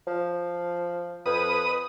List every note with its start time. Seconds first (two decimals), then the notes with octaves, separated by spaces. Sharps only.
0.07 F3
1.26 F2 B4 D#6